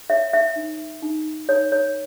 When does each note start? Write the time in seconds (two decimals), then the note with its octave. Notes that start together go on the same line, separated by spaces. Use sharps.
0.10 C#5 E5
0.33 E5
0.56 D#4
1.02 D#4
1.49 D#4 C#5
1.72 C#5